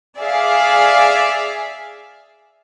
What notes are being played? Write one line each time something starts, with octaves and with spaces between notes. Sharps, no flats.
G#4 D5 E5 F5